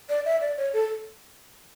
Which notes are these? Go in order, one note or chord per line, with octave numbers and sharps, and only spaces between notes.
D5
E5
D5
C#5
A4